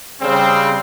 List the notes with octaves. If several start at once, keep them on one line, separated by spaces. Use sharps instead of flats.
C#3 G3 C4